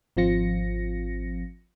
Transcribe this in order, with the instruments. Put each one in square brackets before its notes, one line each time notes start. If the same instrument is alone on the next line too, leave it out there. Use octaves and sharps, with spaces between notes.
[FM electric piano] G#1 F3 C4 F4 A#6 C#7